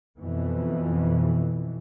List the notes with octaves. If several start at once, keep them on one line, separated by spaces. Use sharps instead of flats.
F2 B2 E3